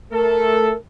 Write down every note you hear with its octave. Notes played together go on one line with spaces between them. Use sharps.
A3 A4 A#4